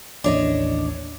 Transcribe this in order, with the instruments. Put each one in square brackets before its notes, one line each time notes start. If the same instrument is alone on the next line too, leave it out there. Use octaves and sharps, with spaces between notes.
[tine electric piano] A1 D#2 [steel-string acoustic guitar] D4 C#5 D#5